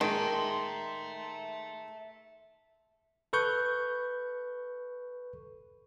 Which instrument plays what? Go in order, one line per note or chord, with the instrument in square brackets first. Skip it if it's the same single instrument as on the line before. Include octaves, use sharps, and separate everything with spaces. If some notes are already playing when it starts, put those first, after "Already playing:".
[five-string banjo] D#3 [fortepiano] G#3 [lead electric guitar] E5 A5 [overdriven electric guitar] A#5 C6
[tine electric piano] A4 B4 C#6 G6